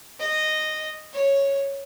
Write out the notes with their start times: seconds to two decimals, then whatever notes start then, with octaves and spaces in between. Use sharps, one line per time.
0.20 D#5
1.13 C#5